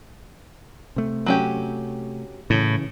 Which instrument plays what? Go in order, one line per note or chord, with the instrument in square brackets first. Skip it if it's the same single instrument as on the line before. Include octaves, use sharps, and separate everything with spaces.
[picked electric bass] C3 A3
[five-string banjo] F#3 C#4 G4
[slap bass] A2 [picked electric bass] C#3 E3